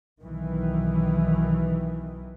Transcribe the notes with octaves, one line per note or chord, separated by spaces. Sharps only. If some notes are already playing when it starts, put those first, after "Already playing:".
B1 D#3 E3